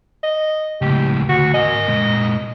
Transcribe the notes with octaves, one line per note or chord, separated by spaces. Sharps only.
D#5
C#2 A2 G4
D2 F#4
A#4 D#5 G#5
A#2 G#3